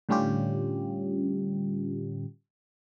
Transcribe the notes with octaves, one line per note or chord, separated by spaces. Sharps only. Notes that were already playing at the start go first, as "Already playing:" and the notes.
A2 D3 G3 C#4 F4 G4